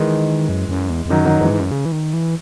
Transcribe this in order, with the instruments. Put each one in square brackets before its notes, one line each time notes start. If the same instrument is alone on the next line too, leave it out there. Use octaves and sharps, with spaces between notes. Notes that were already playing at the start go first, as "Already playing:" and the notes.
Already playing: [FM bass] D#3 [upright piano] E3 G#3
[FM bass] F#2
F#2
E2
E2
[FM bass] F#2 [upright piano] D#3 F#3
[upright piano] D#3 F#3
[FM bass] F#2 [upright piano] E3 G#3
[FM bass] G#2
F#2
C#3
E3
D#3
E3